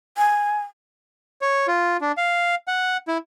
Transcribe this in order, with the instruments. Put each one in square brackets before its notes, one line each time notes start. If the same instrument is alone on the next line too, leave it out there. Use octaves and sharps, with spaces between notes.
[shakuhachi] G#5
[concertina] C#5
F4
D4
F5
F#5
E4